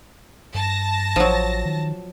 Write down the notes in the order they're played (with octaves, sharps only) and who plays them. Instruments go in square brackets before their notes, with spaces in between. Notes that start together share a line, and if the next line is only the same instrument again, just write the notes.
[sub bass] G2 [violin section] A5 A#6
[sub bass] A1 [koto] F3 F#3
[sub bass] D#3